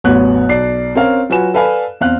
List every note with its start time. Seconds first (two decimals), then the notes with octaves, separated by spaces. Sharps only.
0.04 A1 E2 F#3 B3 C#5 F#6
0.49 B1 D5 C7
0.95 C4 C#4 A#4 C#5 F5
1.30 F#3 F4 F#4 B4 G#5 E7
1.54 A4 B4 D5 F5 G#5
2.01 E2 C4 F5 F#6